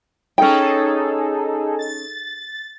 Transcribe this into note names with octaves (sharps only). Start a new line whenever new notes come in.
C#4 D#4 G#4 A4 G5
A6